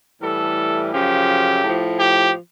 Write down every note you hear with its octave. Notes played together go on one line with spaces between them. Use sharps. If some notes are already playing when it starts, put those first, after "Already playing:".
A2 E3 G3 A4
F#2 C#3 F3 G4
A2 F3
G4